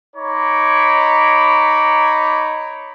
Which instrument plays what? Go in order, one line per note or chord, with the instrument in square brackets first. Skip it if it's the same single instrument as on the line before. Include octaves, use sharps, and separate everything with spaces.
[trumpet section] D#4 C#5 A#5 B5 D6